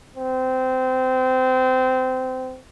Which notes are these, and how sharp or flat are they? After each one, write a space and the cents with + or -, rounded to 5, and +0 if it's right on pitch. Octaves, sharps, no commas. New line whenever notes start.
C4 -20